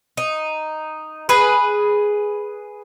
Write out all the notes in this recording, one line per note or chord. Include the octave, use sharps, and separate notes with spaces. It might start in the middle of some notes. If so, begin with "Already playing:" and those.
D#4
G#4 B4